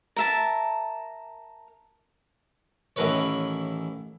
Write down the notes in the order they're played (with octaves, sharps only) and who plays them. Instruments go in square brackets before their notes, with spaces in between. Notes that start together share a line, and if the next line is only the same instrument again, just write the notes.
[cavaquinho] A#4 E5 A5
[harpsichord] A1 D#3 E3 A#4 B4 C#5